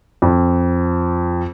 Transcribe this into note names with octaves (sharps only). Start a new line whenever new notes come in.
F2